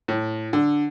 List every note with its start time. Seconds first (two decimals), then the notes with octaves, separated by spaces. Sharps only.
0.08 A2
0.53 D3